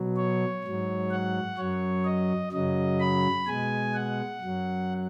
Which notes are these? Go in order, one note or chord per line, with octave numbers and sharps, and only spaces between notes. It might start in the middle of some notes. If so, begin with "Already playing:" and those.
Already playing: B2 F#3
C#5
G#2 F#3
F#5
F#2 F#3 C#5
D#5
F#2 C#3 F#3 D#5
B5
B2 G#3 G#5
F#5
F#2 F#3